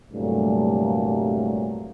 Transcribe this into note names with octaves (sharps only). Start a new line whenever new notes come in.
C2 G2 A#2 F#3 A3